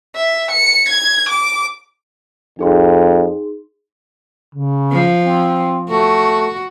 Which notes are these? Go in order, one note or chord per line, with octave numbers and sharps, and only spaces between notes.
E5
C#7
G#6
D6
F2 D#4 G#4 C6
C#3
F3
C4
A3 F#4